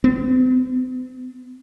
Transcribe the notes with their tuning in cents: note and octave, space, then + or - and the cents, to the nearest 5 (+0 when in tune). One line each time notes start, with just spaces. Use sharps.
C4 -45